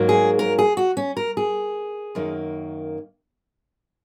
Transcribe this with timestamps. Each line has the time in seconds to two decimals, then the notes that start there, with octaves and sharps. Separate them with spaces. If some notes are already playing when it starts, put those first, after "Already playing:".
Already playing: G#2 F#3 A#3
0.09 G#4
0.39 A#4
0.59 G#4
0.77 F#4
0.97 C#4
1.17 A#4
1.37 G#4
2.15 F#2 D#3 A#3